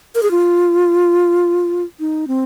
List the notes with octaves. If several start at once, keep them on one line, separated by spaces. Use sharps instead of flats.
A#4
G#4
F4
D#4
C4